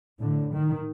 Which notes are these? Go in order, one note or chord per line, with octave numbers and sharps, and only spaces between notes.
A2 D3
D#3